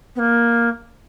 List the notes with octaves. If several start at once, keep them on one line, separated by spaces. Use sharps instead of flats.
B3
A#3